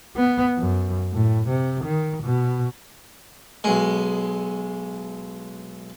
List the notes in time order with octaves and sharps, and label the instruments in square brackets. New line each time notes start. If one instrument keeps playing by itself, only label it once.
[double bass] B3
F#2
A2
C3
D#3
B2
[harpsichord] B1 G#3